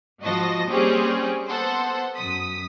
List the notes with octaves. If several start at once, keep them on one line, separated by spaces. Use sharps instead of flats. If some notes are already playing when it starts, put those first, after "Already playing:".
G#2 F3 F#4 D#5 A5 A#6
G3 A#3 C4 C#4 G4 G#4
B3 A4 C5 F#5
F#2 D#6 B6